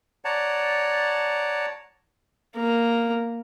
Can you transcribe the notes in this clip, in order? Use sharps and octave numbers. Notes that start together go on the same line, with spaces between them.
C#5 D5 F#5 A5 A#5
A#3 A#4